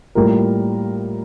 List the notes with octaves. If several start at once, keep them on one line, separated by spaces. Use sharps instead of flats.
A2 G3 A#3 F4 A#4